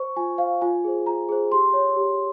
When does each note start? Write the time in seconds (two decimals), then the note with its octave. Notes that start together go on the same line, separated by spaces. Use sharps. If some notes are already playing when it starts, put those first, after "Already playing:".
Already playing: C5 C#6
0.16 F4 G#5
0.38 C5 F5
0.61 F4 G#5
0.84 G#4 C5
1.06 F4 A#5
1.29 G#4 C5
1.52 G4 C6
1.73 C#5
1.96 G4